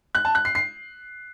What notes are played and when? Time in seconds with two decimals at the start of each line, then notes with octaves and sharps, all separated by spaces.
0.15 F#6
0.25 A5
0.35 F#6
0.45 C7
0.55 C7